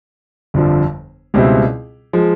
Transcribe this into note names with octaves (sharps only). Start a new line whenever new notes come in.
G1 F2 D3 F3
C#2 B2 G3 C4 E4
F3 G#3